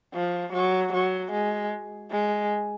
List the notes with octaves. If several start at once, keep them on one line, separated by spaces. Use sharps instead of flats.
F3
F#3
F#3
G#3
G#3